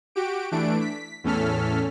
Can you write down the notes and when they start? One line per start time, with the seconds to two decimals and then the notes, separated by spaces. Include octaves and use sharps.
0.15 F#4 G4 D7
0.51 E3 A3 D4 D7
0.81 B6
1.24 E2 A2 C#4 A4 F6 B6